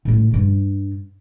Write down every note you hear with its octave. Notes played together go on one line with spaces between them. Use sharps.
A2 A3
G2 D4